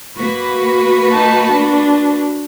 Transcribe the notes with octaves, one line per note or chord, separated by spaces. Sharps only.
A#3 F#4 B4
D#4 A5
D4